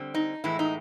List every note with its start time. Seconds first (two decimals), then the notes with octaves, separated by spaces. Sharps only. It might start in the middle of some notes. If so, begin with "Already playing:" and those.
Already playing: D3 G3 C4
0.14 D#4
0.44 A2 E3 G#3 B3 E4
0.59 D#4